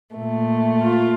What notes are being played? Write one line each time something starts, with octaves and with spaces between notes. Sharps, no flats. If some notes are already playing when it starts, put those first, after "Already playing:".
A#2 A3
F4